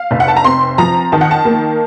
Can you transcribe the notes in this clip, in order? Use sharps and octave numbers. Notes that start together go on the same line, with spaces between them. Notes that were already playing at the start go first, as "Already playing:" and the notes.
Already playing: F5
F1
F#5
A5
A#5
C4 C6
F3 A#5
D#3 A5
F#5
A5
A#3